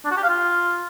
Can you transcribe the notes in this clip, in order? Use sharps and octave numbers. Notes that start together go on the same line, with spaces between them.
D4
F#4
G4
F5
F4